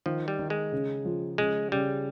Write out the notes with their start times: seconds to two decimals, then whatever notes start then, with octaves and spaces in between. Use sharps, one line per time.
0.06 D#3 F3
0.28 G3
0.39 D#3
0.50 G#3
0.72 C#3
1.05 F3
1.38 C#3 G#3
1.72 C#3 G3